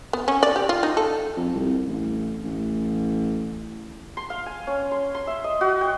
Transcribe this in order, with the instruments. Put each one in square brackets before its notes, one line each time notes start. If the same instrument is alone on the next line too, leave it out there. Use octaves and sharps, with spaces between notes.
[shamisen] B3
C#4
D5
G4
F4
D#4
A4
[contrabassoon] F2
C2
A1
A1
[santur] C6
F5
G#5
C#4
C6
C6
E5
D#5
F#4
G5